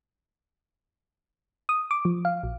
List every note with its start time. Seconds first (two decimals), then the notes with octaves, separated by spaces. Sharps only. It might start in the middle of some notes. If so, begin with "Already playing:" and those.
1.69 D#6
1.91 D6
2.05 F3
2.25 F5
2.43 A#1